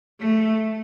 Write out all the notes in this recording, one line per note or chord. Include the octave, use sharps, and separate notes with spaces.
A3